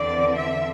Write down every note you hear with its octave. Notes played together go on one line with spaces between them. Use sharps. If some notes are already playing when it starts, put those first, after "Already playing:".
Already playing: E2 D3 C4 D5
E5